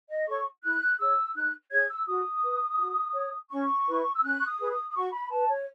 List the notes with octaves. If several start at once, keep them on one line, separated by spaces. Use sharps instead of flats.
D#5
A4 C#5 C#6
E4 F#6
G#4 C#5 E6
D#4 F#6
G#4 C#5 G#6
E6
F#4 D#6
B4
F#4
C#5
C#4 C#6
E4 B4
E6
C#4 F#6
C#6
D#6
G#4 B4
D#6
D#6
F#4 C#6
B5
B4 A5
C#5